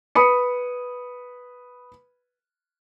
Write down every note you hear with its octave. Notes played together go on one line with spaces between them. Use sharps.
B4 B5 D#6 C#7